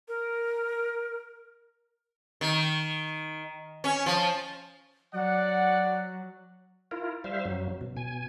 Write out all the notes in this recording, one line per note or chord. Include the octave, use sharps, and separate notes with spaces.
A#4
D#3
C#4
F3
F#3 D5 F#5
E4 F4 A#4
G3 C5 E5 F5
F#2 F#3
B2
B2 G#5